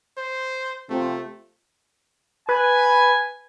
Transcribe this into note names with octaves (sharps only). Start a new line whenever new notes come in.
C5
C3 F3 A3 C4
B4 G#5